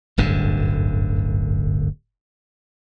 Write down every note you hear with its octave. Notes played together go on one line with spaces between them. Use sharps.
D1 G1 F#2 D3